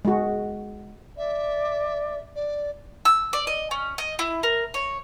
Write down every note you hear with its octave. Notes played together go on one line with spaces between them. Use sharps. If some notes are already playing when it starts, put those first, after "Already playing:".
G#3 F#4
D5 E5
D5
E6
D5
D#5
C#4
D#5
E4
A#4
C#5